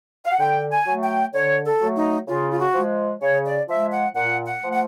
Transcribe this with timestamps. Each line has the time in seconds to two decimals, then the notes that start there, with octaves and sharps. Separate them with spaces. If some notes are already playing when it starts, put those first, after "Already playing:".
0.25 F5
0.31 F#5
0.39 D3 G5
0.71 G#5
0.85 F#3 A3
1.02 G5
1.33 D3 C#5
1.65 A4
1.80 F#3 A3
1.96 D#4
2.27 C#3 F4
2.50 F4
2.58 F#4
2.74 F3 G#3
3.21 C#3 C#5
3.44 D5
3.68 F3 G#3 E5
3.91 F#5
4.15 A#2 F#5
4.46 F#5
4.62 F3 A3
4.72 F#5